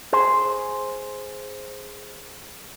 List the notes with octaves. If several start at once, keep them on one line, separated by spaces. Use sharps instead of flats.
G#4 C5